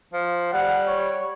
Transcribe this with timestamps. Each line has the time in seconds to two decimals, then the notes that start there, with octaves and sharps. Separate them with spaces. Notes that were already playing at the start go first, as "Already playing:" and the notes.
0.14 F3
0.53 G3 F#5
0.87 C#5